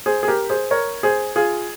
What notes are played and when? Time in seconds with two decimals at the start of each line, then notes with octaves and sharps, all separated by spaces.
0.06 G#4 C5
0.23 G#4
0.28 G4 A#4
0.50 G#4 C5
0.71 A#4 C#5
1.03 G#4 C5
1.36 F4 G#4